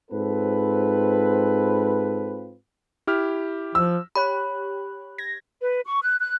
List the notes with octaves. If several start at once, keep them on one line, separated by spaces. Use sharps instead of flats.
G#2 C4 F4 A4 B4
E4 G4 F6
F3 E6
G4 C#5 B5 F#6
G#6 A#6
B4
C#6
F#6
F#6